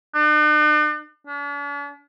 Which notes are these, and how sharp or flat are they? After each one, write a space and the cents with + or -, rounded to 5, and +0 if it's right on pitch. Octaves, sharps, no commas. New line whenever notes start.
D4 +45
D4 -45